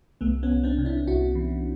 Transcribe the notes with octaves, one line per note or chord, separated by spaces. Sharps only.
C2 A3 B3
B3 C#4
C2
C4 D4
C3
D4 E4
C2 E4 F#4
E3